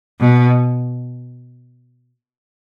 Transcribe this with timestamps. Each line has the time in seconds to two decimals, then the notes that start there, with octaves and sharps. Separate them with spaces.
0.20 B2